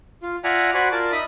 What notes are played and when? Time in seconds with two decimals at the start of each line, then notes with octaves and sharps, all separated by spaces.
0.23 F4
0.44 F4 D5 E5 F#5 G#5 A#5
0.74 F#4 C5 D5 F#5 G#5 B5
0.92 F4 A#4 D5 A5
1.12 D#4 E5 B5 D#6